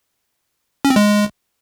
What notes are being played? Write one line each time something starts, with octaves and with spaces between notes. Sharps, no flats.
C#4
C4
G#3